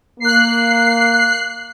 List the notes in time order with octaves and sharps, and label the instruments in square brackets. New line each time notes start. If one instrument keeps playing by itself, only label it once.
[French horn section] A#3 [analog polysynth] F#6 C7